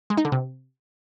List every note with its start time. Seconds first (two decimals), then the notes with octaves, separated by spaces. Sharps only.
0.10 G#3
0.17 D#4
0.25 D3
0.32 C3